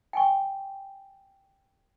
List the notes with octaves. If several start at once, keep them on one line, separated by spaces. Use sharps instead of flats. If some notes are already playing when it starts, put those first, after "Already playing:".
G5 G#5 C#6